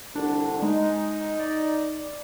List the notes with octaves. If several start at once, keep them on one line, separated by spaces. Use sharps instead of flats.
C2 D3 D4
G#3 D#4
D5